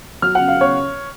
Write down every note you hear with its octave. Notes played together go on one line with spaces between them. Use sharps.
F#3 F6
F#5
C#3
F5
C#3 C#5